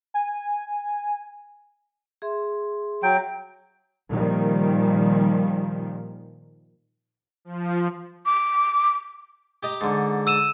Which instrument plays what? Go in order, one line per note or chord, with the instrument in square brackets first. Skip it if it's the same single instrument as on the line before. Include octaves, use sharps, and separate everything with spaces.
[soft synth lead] G#5
[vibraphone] G#4 E5 C6
[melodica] F#3 G5
[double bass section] A#2 D#3 F3 G3
[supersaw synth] F3
[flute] D6
[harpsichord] G4 D#5 A#5
G#2 D3
[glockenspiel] E6 D#7 E7